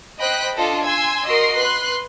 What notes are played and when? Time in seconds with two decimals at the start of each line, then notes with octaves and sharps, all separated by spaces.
0.20 C5 D#5 G5 B5 F#6 B6
0.55 D4 F4 A4 D#5
0.84 G#5 C6 E6 G#6
1.26 F#4 A#4 D#5 C6 C7
1.56 B4 C6 F#6